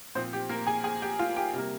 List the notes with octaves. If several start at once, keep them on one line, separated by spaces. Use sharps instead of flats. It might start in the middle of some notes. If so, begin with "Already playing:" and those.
A#2 F3 C4 C5
G4
A#3 A#4
G#4 G#5
G#4 G#5
G4 G5
F4 F5
G4 G5
C3 G3 A#3